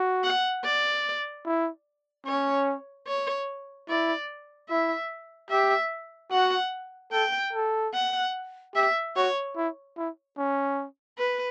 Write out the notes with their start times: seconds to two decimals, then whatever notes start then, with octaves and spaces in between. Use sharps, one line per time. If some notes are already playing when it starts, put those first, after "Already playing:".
Already playing: F#4
0.24 F#5
0.64 D5
1.45 E4
2.27 C#4 C#5
3.07 C#5
3.89 E4 D5
4.69 E4 E5
5.50 G4 E5
6.32 F#4 F#5
7.12 A4 G5
7.53 A4
7.94 F#5
8.75 G4 E5
9.16 F#4 C#5
9.56 E4
9.97 E4
10.37 C#4
11.18 B4